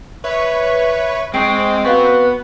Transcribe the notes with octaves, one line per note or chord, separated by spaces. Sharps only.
B4 C#5 E5 C#6
G#3 C4 G#4 G5 C#6 C7 D7
B3 F#4 B4 F5 C#6